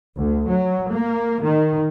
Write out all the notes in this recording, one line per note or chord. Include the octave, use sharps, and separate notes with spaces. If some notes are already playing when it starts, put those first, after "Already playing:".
D2
F#3
A#3
D#3